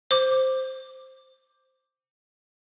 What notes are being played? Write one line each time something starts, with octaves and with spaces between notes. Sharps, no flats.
C5 D6